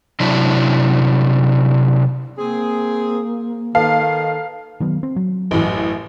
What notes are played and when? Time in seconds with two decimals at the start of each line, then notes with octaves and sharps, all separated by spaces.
0.20 C3 F#3 D4 E4
2.38 A#3 C4 G#4
3.75 D#3 A4 B4 F5 A5
4.80 D#3 F#3 B3
5.03 C4
5.16 F#3
5.51 A1 F#2 A2